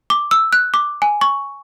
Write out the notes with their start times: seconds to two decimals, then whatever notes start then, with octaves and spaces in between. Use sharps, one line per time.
0.10 D6
0.31 E6
0.53 F#6
0.74 D6
1.02 G#5
1.21 C#6